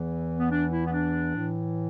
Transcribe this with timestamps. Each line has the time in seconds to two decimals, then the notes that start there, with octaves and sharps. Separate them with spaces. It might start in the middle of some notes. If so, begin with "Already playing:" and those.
Already playing: E2 E3
0.38 B3
0.50 D4
0.70 E4
0.86 B3
0.92 D4
1.35 A2 E3